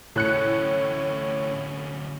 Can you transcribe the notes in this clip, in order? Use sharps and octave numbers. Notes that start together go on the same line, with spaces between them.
D2 A2 C#4 C#5 F#6 C#7